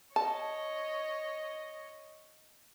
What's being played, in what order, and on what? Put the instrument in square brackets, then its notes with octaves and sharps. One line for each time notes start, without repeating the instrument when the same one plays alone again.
[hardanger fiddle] C#5 D#5 [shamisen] A5